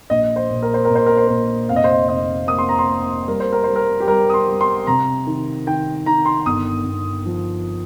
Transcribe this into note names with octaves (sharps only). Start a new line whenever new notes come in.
A#1 D#5
C5
A#2
A#4
C5
A#4
A#2
C5
A#4
C5
A#2 A#4
F1 F5
D#5
C5
D#5
F1 D#5
A#3 D#6
C6
A#5
C6
A#3
G3 A#4
C5
A#4
G3 C5
A#4
G4
G3 A#4
D#6
C6
G3
C6
C3 A#5
D#3
D#3 G5
D#3 A#5
C6
G1 D#6
G1
F3